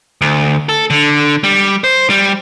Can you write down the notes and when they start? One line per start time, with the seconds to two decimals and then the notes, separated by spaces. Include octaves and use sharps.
0.21 D2
0.69 A4
0.90 D3
1.44 G3
1.84 C5
2.10 G3